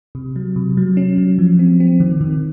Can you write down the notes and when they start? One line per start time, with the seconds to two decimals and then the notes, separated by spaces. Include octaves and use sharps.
0.15 C3
0.36 F#3
0.56 C3
0.77 F#3
0.97 C#4
1.18 F#3
1.38 F3
1.59 C4
1.80 C4
2.00 D#3
2.21 D#3